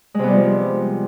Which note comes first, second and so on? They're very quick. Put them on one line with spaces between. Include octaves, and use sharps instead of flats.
G#3 C3 B3 G3 F3